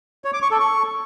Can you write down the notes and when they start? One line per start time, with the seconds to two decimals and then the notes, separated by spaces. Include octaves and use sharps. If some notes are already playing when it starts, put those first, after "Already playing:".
0.25 C#5
0.33 D6
0.42 C#6
0.51 A4
0.60 C#6